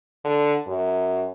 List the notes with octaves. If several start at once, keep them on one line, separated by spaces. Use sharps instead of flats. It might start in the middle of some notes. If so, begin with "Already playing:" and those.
D3
F#2